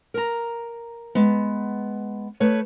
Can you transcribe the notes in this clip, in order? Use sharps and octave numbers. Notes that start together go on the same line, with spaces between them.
A#4 A#5
G#3 B3
A3 B4 C#5